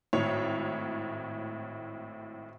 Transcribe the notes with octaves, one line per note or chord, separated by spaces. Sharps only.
G#1 A2 C#5